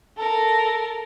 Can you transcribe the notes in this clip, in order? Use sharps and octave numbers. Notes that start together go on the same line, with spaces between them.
A4 A#4